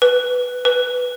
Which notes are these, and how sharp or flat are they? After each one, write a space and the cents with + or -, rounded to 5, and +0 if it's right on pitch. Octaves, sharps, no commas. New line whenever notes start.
B4 +5
B4 +5